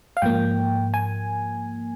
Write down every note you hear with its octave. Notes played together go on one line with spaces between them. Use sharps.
F5
G#2 F3 A#3 G5
G#5